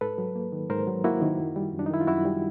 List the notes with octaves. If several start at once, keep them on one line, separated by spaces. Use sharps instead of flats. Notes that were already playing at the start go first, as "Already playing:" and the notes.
G#2 A4 B4
F#3
A#3
D#3
G#2 A#4 C5
F#3
A#3 E4 F#4
D#3
F#2
G3
F#2
D4
D#4
D#3 E4
F4
F#2 E4 F#4
G3